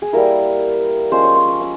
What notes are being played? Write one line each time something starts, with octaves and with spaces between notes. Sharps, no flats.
G#4
G3 A#3 E4 A#4
F3 G#3 C#4 C5
C#5
C6
C#6
E6